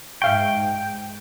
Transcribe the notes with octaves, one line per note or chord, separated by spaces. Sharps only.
G#2 E5 F5 G5 C#6